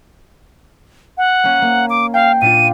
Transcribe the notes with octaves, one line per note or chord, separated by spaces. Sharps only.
F#5
A#3 C#4
A#3
D6
F5 G5 C7
A#2 D4 F4 D#7